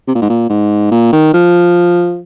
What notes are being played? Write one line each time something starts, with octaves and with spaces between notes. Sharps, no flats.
C3
A#2
G#2
A#2
G#2
A#2
D#3
F3